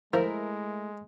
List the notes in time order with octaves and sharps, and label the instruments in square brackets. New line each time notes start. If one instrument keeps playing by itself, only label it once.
[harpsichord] F3 [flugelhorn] G#3 [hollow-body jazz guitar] A3 E4 [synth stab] A#4